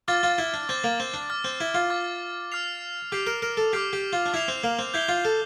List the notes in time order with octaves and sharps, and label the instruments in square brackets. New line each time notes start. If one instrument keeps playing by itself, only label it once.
[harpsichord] F4 [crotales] D6 F6 A6
[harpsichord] F4
E4
D4
[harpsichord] C4 [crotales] D6 F6 A6
[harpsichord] A#3
C4
D4
[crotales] D6 F6 A6
[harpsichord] C4
E4
F4
[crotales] D6 F6 A6
D6 F6 C7 F7
[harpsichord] G4 [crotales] D6 F6 C7 F7
[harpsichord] A#4
A#4
A4
[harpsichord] G4 [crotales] D6 F6 C7 F7
[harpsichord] G4
F4
D4
[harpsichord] E4 [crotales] D6 F6 C7 F7
[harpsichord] C4
A#3
C4
[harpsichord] E4 [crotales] G6 C7 G7
[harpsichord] F4
A4